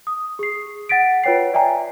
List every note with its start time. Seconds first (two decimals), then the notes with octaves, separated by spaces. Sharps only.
0.07 D#6
0.39 G#4 C7
0.89 F#5 A6 B6 D7
1.24 F4 B4 C#5 G5 C7
1.54 D5 E5 G5 G#5 A#5